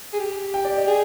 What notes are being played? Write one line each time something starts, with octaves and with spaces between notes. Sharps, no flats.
G#4
G4
G5
D5
D#5
G#4